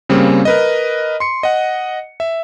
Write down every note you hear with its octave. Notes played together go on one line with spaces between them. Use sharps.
C#3 G3 A#3 C4 C#4
A#4 B4 D#5
C6 C#7
D#5 F#5
E5